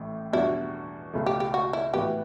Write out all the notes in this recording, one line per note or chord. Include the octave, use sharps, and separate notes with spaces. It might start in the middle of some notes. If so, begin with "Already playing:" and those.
Already playing: A1 A2
E2 B2 G3 D4 E4 F#4
C#2 B2 A3
G4
G4
F#4
E4
A2 E3 B3 F#4 G4 B4